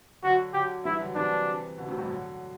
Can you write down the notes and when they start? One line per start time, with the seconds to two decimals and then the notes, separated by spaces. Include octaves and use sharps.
0.23 D3 F#3 F#4
0.54 D3 F#3 G4
0.85 E3 G3 E4
1.00 D3 F#3
1.15 C3 E3 D4
1.78 B2 D3
1.88 A2 C3
1.98 G2 B2
2.09 D3 F#3